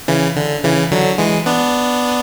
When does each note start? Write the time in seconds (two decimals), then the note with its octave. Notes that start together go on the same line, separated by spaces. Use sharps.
0.08 C#3 E3
0.37 D3
0.64 C#3 E3
0.91 D3 F#3
1.18 E3 G#3
1.46 B3 D4